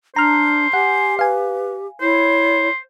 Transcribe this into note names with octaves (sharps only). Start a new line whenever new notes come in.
D4 C5 A#5 F6
G4 F#5 G#5
B4 F5 G#5
E4 C5 C#5